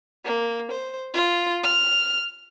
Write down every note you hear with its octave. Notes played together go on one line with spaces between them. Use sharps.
A#3
C5
F4
F6